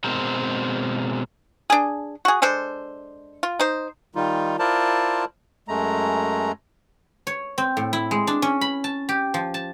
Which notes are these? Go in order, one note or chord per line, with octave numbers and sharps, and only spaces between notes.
B2 G#3 C4 A#4 C5
D4 G#4
F#4 G#4
G#3 D4 A4 C5
F4
D#4 C5
D#3 G3 D#4 F4
E4 F4 A#4 C5 D5 A5
F#2 G#3 A3 A#5
C#5
C4
A2
E4
G#3
D4
C#4
B5
A5
G4
F3
A5